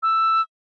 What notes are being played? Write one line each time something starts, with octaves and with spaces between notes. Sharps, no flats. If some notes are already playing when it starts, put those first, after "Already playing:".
E6